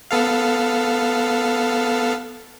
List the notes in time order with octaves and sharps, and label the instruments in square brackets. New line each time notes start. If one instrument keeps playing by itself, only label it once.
[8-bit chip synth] B3 A4 F5